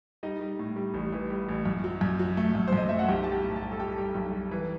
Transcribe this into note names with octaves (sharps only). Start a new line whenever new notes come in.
G3 D#4 D#5
G3
A2
G3
A1
E3
G3
A1
F#2
F#3
F#2
F#3
A3
F#2
C5
F#2 D#5
A3 E5
F#5
B1 G4 G5
G3 A5
G4 G5
A2
A5
G3
A4 A5
G3 G4 G5
G3
B1
G3
E3